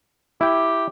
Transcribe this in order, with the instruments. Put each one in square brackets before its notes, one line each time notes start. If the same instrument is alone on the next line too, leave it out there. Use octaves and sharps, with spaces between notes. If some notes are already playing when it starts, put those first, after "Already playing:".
[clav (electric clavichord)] E4 G5 [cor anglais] G4